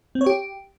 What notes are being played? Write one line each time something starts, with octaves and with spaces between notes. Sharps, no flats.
C4
C#5
G4